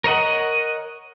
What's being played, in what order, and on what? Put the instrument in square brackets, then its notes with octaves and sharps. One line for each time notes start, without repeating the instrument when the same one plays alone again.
[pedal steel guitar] A#4 C#5 D#5 F#5